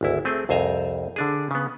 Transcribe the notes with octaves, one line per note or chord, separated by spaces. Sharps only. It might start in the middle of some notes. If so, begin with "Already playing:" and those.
G#1 D2 E4
A3 C4 G#4
C2 F2 C5 G#5 A#5
D3 D4 G#4
C#3 B3